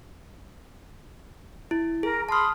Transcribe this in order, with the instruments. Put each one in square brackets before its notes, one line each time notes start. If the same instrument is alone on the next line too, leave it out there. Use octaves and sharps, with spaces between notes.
[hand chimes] E4
[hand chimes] G#4 [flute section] A#4 A#5
[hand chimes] A5 F6 [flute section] B5 C6 D#6